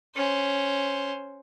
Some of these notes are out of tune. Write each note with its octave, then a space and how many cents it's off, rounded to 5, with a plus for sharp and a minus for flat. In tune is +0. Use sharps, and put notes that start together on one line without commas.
C#4 +0 C5 +0